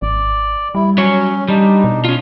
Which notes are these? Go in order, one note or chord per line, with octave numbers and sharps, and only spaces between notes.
G#1 D5
G3 E4
F#3 C#4 C#5
G3 D4 D#4
B2
C#4 F4